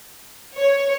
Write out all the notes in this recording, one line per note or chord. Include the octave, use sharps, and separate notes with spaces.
C#5